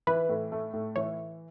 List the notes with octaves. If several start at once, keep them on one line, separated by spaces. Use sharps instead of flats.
E3 B4
A2
A3
A2
E3 C#5